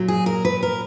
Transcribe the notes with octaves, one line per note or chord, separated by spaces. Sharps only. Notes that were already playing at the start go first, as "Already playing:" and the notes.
Already playing: A#2 F#3
G#4
A#4
B4
A#4